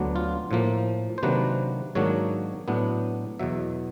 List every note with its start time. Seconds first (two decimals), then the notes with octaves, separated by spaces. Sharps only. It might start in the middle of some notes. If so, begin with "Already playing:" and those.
Already playing: D2 D3 F#3 B3 D4
0.16 F4
0.51 A2 F3 A#3
1.18 C5
1.23 C3 D#3 F#3 A#3 D4 B4
1.95 G#2 D#3 F#3 A#3 D4 C#5
2.68 A2 F#3 B3 D4
3.39 E2 B2 F#3 E5